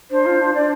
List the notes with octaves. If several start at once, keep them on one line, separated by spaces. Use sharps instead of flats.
D4 C5
F4
D4
D4 D5